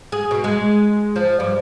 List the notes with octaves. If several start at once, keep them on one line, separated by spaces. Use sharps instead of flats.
G#4
B2
G#3
F3
G2